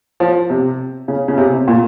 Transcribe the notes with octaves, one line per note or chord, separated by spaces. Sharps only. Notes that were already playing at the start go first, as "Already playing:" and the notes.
F3
C3
C#3
C#3
C3
C3
A#2